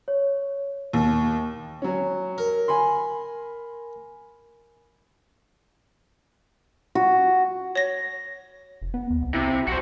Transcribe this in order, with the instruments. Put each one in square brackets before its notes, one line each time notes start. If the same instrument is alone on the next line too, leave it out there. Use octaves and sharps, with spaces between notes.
[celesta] C#5
[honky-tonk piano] D#2
[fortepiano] F#3 C#4
[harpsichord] A#4
[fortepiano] G#5 B5 C6
[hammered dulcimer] F#4
[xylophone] C#5 A#6
[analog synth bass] F1
B3
D#2
C2
[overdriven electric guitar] C3 [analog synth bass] E4
[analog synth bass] B1 [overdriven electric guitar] F#4 C5